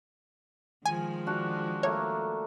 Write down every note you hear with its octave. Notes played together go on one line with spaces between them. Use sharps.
D#3 F3 G#3 G#5
D4 F#4
A3 A#3 C#5 D6